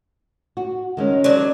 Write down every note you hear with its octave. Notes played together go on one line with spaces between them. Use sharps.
F#4
D#3 G#3 C#4
F#3 D4